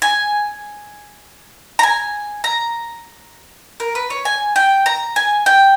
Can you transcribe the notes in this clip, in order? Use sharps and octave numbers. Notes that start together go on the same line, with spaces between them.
G#5
A#5
G#5
A#5
A#4
B4
C#5
G#5
G5
A#5
G#5
G5